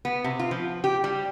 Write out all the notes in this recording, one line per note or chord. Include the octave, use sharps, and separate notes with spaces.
B3
C3
F4
F3
G4
G3